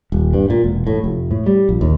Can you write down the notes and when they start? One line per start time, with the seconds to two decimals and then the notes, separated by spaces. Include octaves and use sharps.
0.12 D#1
0.34 G2
0.50 A#2
0.64 E1
0.87 A2
1.04 F1
1.31 A2
1.46 G3
1.69 A#1
1.81 D#2